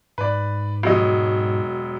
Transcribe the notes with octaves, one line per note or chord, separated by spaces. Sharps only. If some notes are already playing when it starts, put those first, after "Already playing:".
G#2 B4 D5
E1 F#3 D#5